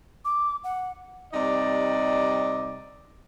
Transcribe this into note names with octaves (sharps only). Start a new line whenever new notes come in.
D6
F#5
C3 G3 D#4 D5